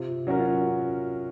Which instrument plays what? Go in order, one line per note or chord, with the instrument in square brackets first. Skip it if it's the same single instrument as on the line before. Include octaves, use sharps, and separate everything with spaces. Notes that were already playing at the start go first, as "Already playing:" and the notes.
Already playing: [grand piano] C3 [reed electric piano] F4
[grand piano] F#3 C#4 F#4 A#4
[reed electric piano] F4